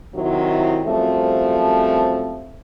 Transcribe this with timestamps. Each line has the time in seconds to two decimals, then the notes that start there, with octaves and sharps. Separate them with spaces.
0.14 C3 D#3 F#3 E4
0.85 F#2 F3 G3 A3 C4